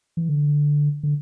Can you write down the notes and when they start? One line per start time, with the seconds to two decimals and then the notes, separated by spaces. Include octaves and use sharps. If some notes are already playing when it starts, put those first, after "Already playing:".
0.17 E3
0.29 D3
1.03 D3